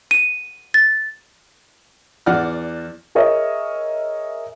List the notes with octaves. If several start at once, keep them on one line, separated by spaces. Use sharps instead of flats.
D#7
A6
E2 D5 F#5 F6
G#4 A#4 C#5 D#5 E5